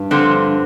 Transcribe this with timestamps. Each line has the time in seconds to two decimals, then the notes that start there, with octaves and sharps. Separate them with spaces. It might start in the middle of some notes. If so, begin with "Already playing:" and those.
Already playing: G2
0.11 D3 F3 C4